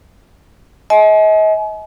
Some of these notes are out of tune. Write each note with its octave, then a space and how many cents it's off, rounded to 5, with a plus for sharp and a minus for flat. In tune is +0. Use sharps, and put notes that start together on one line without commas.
D#5 +40 G#5 +40